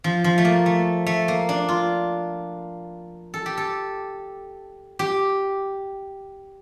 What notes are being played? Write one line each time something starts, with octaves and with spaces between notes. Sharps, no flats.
F3
F3
A3
A#3
A3
A3
A#3
D4
F4
A4
G4
A4
G4